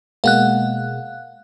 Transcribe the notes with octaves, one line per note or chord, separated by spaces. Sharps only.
B2 G#3 A#3 F5 F#5 F#6